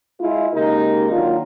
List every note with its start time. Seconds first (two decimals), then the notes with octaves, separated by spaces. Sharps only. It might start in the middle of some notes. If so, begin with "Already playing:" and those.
0.21 G#3 E4 F4
0.54 C#3 G#3 A#3 D#4 G4 A#4
1.11 D#3 F#3 A#3 D4 F4